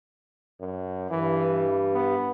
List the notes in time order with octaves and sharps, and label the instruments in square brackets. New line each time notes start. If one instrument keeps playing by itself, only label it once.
[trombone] F#2
[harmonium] G2 [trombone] E3
[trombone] B3